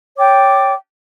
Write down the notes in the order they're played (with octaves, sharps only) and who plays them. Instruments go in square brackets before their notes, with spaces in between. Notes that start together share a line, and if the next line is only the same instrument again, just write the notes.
[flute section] C#5 D5 G5 D6